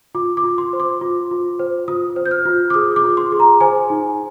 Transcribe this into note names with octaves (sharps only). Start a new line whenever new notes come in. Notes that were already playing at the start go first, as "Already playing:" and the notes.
F4 D6
D6
F4
C6
C5
D6
F4
F4
C5
F4 D#6
C5
G6
F6
F4
D6
G#4 D#6
D6
F4
C6
G#4
A#5
C5 G#5
D#4